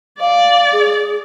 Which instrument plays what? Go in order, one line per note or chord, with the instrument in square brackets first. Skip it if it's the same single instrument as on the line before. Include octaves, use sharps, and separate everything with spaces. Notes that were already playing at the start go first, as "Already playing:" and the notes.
[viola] D5 [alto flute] F5
[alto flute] G#4